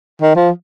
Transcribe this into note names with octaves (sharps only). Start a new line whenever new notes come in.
D#3
F3